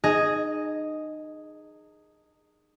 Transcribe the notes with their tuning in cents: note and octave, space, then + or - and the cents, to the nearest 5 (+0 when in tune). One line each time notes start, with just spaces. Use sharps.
D#4 -30 G#4 +0 D#5 +0